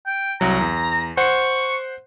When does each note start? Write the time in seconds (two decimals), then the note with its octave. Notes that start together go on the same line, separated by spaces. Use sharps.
0.06 G5
0.41 C2 F#3 A#5
0.61 E2
1.17 C5 F#5 C#6